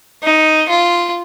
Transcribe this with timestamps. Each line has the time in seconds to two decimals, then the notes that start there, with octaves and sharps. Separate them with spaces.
0.23 D#4
0.69 F4